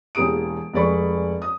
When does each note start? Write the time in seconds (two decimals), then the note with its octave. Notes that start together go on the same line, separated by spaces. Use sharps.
0.15 E1 E2 A#3 G4 D#6 D7
0.74 F1 G#3 D5 B5 C#6
1.42 D#6